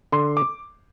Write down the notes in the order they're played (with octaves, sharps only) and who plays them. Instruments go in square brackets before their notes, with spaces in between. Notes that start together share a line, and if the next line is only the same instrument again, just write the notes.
[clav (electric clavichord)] D3 [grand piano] C6
[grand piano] D6